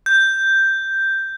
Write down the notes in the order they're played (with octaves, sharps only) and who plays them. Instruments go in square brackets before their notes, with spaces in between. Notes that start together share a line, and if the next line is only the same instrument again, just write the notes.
[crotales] G6